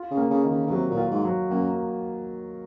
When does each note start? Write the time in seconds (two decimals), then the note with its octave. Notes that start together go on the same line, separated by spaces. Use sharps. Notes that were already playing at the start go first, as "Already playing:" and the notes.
Already playing: F4
0.11 C#3
0.17 A#3
0.31 C#3
0.44 D#3
0.50 C#3
0.66 C#3
0.70 C3 F#3
0.91 A#2
0.97 F4
1.11 G#2
1.25 F#3
1.50 F#2 A#3